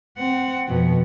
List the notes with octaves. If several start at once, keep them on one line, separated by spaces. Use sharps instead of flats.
C4 F#5
F2 B2